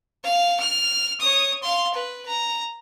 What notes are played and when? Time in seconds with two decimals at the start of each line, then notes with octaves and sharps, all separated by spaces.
0.24 F5
0.60 F6
1.20 C#5 D#6
1.62 F5 C6
1.93 B4
2.28 A#5